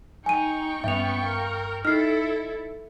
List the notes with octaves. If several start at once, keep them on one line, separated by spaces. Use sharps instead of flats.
D#4 G5 G#5 C#6 D#7
G2 B3 C#4 E5 F7
A#4 F5
D#4 E4 A4 F6 C7